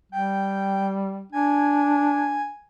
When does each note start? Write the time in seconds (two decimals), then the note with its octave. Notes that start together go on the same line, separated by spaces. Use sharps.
0.12 G3 G5
1.32 D4 G#5